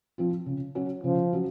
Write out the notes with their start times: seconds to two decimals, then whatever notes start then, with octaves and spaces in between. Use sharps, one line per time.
0.18 F3 C4 F4
0.46 C#3
0.75 F#3 C#4 F#4
1.04 C#3 F3
1.33 F#3 C#4 F#4